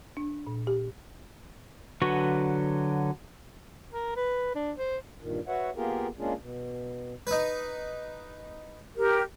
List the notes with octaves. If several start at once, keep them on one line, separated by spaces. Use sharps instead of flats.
D4
A#2
G4
D3 F#3 F#4 B4 C#6
A#4
B4
D4
C5
G2 A#2 D#3
F#4 B4 C#5 E5 F#5
A#3 B3 F4 G4 G#4 A#4
G#3 A#3 C#4 D4 F4 G#4
B2
D#4 B4
G4 A#4